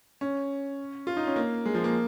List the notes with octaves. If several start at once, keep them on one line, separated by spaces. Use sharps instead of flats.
C#4
F4
D#4
C#4
A#3
G#3
F3
A#3